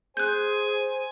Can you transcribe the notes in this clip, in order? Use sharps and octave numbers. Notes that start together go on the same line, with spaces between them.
G#4 C5 G#5 F#6 G6